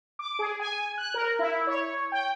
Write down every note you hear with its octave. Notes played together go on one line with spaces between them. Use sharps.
D6
G#4
G#5
F#6
A#4
E4
C#5
G5